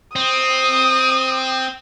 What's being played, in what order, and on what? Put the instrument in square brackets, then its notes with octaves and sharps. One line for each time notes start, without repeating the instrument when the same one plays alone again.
[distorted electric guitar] C4 [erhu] D#6